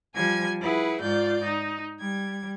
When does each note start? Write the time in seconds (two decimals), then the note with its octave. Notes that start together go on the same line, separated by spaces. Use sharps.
0.15 F3 G3 G#5 G#6
0.60 E4 G#4 B4 F#5
1.01 G#2 F4 D5 G6
1.43 D#4
2.00 G3 G#6